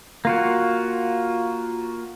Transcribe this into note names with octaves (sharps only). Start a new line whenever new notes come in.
A#3 F4 F#4